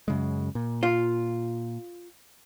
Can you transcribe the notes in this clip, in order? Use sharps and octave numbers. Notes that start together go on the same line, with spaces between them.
F#2 C#3 G#3
A#2
F4